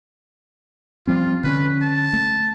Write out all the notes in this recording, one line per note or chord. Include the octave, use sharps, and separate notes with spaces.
F3 G3 C4 F4
D3 C#4 B4
A5
A3